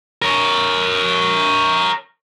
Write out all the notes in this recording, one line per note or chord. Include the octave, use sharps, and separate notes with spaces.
A#4 C#5